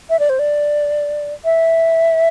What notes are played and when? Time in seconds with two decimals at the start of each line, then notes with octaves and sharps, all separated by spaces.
0.10 E5
0.19 D5
0.29 C5
0.39 D5
1.45 E5